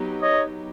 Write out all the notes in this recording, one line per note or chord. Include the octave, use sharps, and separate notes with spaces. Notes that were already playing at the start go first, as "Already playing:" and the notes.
Already playing: F#3 B3 D#4 G4
C#5 D#5